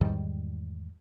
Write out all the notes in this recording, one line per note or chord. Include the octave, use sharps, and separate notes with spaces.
E2 G#2 D#3 G3